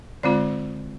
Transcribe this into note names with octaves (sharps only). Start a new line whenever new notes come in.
D3 G#3 C4 F4 D5